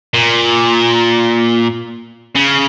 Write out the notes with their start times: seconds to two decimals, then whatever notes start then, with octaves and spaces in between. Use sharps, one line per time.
0.14 A#2
2.35 C#3